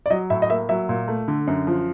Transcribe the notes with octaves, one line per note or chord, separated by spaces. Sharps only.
D5
F#3 D#5
A2 E5
D#5
A#3 E5
F#3 E5
A#2
A3
D3
F#2
F3